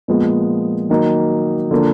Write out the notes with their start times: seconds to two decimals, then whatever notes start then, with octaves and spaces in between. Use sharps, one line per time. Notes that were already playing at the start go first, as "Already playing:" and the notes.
0.08 A#2 F3 G#3 B3
0.90 D#3 F#3 A#3 D#4
1.71 D3 F3 A#3 D4